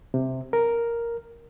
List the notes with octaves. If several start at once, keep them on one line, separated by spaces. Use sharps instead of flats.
C3
A#4